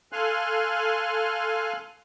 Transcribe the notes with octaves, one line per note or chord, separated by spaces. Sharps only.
A4 F5 G#5 C6 F6 F#6